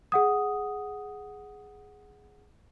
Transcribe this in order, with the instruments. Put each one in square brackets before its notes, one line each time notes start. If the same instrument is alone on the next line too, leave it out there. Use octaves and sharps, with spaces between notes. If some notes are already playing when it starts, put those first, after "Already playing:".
[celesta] G#4 F#5 D#6